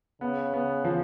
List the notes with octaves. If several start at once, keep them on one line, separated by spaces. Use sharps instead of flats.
C#3 B3
B3
F3